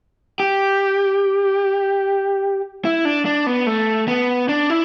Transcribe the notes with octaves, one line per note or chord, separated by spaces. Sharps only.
G4
E4
D4
D4
B3
A3
B3
D4
E4